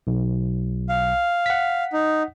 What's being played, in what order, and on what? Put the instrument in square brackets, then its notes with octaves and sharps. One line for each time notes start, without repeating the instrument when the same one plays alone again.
[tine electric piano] B1
[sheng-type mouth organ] F5
[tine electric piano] F#5 B6
[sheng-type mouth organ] D#4